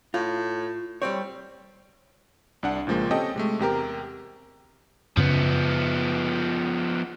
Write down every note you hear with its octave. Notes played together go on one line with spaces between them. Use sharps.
A2 F4
G3 C4 C#5
C2 D4 F#5
C#2 A#2 F3 G#3 A#3
C4 C#4 G4 A4 D#5 G5
C3 G#3 A3
E2 C3 G4 A#4
F#2 C#3 F3 B3 C#4